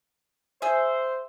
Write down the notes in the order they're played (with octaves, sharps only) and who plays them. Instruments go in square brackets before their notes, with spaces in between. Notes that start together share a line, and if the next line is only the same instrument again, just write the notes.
[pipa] G#4 E5 [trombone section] C5